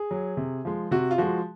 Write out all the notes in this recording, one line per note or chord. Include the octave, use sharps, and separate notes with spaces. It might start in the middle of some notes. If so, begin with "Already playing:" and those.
Already playing: G#4
F#3
C3
F3 G#3
C3 F#4
F4
F3 G#3 F#4